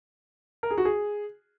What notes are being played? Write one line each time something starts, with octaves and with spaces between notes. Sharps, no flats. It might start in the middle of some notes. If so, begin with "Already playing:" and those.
A#4
G#4
F#4
G#4